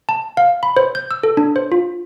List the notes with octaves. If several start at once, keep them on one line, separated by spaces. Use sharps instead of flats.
A5
F5
B5
C5
G6
E6
A4
D4
C5
F4